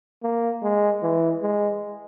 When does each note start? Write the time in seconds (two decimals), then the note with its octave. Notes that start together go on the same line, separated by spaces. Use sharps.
0.23 A#3
0.62 G#3
1.03 E3
1.42 G#3